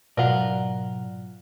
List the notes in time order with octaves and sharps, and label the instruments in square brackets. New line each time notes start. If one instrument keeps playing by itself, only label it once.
[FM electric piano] G#2 F#3 [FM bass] B2 [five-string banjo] F4 A#4 [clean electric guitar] D5 F#5